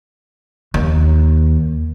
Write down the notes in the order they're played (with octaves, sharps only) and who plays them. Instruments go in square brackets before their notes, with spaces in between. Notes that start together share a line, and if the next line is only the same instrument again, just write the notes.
[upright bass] D#2